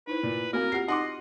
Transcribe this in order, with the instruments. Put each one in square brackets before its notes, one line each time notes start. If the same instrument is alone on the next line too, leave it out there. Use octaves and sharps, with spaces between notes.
[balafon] D#4 E4 C5 [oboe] B4
[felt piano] A#2
[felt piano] A#3 [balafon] C4 F#4 [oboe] A#4
[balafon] F4 G4 F#5 [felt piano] F6 C7
[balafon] D#4 [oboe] D#5 [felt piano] F#5 C6 D6